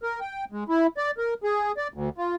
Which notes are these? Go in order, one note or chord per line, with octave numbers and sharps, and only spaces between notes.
A#4
G5
G#3
E4
D5
A#4
G#4
D5
D2
F4